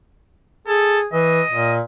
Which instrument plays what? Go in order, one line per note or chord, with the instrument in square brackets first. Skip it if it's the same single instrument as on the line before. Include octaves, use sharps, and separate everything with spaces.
[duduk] G#4 [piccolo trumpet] A4
[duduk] E3 [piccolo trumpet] D#5
[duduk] A#2